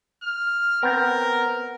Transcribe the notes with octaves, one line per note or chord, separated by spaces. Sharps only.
F6
B3 C4 A#4